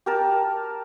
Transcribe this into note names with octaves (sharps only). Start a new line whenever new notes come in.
G4 A#4 A5